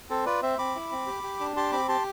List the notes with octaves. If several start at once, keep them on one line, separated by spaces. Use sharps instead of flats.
C4 A4 C5
F4 B4 D5
C4 C5 E5
C4 B5 D6
E4
C4
G4
G4
D4
G4 A5 C6
C4 B5 D6
G4 A5 C6